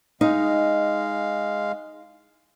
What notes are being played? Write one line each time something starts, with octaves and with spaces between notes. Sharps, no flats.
G#3 D#4 F5